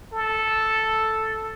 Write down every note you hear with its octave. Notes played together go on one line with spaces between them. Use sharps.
A4